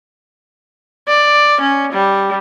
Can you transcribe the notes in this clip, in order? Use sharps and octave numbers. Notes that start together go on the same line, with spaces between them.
D5
C#4
G3